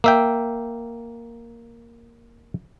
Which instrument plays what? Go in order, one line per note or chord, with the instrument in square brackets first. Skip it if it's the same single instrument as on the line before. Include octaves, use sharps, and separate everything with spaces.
[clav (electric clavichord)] A#3 E5 G5